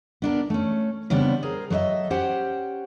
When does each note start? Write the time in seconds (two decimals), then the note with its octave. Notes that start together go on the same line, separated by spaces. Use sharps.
0.22 B3 D4 A#4
0.50 A3 C#4
1.10 C#3 G3 B3 C4 D4
1.43 G#4 A#4 C5
1.70 F#3 A4 C5 D#5 E5
2.10 C#4 G4 C5 F#5 G5